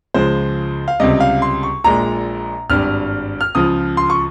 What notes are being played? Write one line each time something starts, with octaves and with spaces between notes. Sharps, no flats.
C#2 C#3 F3 G#3 C5
F5
C#2 C3 G3 D#5
F5
C6
C#6
A#1 A#2 G#3 A#5
G#1 G2 G3 F6
F6
C#2 C#3 F3 D#6
C6
C#6